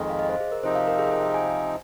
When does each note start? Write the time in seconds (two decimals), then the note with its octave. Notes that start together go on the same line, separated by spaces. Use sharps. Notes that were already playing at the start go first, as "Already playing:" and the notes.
Already playing: F2 D#3 G#3
0.10 F5
0.19 D#5
0.29 C5
0.40 G#4
0.52 A#4
0.64 C3 F3 C4 D#4 C5
0.75 F5
0.88 A#4
0.99 G#4
1.11 C5
1.22 F5
1.34 G#5